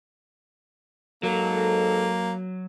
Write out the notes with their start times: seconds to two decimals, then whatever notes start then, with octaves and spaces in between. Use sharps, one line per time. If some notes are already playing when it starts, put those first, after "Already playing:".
1.23 G#2 F#3 A#3 A4